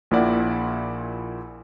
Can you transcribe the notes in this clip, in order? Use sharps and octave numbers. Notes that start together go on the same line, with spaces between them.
A#1 A#2 E4 D5 F#5